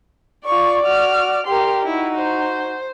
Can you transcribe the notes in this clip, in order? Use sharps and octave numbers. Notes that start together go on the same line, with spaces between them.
F4 D5 C#6
F#4 F6
G4 A#4 C6
D#4 E4 F#4
C5